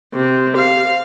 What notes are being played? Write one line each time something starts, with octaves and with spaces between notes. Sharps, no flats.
C3
F5